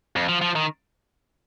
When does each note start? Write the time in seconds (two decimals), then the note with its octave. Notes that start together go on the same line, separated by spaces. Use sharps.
0.16 F2
0.29 F3
0.42 F3
0.55 D#3